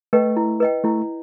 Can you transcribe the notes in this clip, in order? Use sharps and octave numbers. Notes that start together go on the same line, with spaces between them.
A3 B4 D#5 G5
E4
B4 D#5 G5
A3 E4